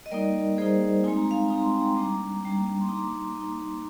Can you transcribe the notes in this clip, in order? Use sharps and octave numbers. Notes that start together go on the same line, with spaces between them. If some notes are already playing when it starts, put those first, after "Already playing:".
D#5
G3 A#3 D#4 A#4 D5
G3 A#3 D#4 G#4 C5
G#3 C4 D#4 G#5
A#5
F5 G#5
G#3 C4 D#4 A#5
C6
G5 A#5
G3 A#3 D4 A#5 D6
G3 A#3 D4
C6
A#3 D#4 A#5 D6
A#3 D#4